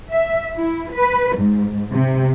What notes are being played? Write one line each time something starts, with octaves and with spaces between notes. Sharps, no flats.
E5
E4
B4
G#2
C3